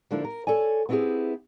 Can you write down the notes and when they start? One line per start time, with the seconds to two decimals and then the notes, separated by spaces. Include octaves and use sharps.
0.11 D3 F3 A#3 D4 E4
0.24 A#4
0.47 A4 C#5 D5 G#5
0.89 B3 C4 E4 F4 G4 G#4